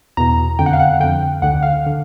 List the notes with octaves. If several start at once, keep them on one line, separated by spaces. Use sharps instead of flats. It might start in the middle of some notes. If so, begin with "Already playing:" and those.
E2 B2 A#5
F2 D3 G5
F#5
F5
F#5
F2 D3 G5
D2 D3 F#5
F5
D3